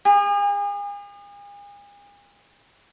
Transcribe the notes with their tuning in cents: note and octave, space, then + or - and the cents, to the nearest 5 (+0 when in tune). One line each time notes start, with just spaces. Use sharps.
G#4 -40